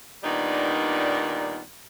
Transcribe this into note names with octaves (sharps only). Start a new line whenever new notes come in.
A#2 D#3 G3 B3 D4 D#4